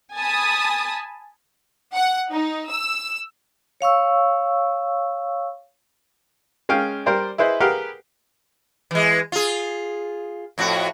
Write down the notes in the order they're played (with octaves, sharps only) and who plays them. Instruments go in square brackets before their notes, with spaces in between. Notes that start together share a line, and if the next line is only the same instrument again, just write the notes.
[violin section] G#5 A5 B5 D#6
F#5
D#4
E6
[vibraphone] C#5 F5 C#6 E6
[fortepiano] G#3 C#4 F5 G5
G3 A#4 C5 D5 G5
E4 G#4 B4 C5 D#5
G4 G#4 A#4 B4 F5 F#5
[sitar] E3 G#3
F4 G#4
F2 A2 F#4